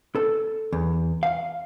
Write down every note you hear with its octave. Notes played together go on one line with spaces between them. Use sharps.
A4
E2
F5